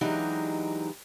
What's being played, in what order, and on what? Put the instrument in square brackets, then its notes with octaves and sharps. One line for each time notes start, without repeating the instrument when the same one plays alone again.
[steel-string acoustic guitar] E3 F#3 G#3 D4 D#4 G4